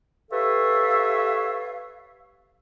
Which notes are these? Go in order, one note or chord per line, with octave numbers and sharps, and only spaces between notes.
G4 A4 B4 C#5 E5 F5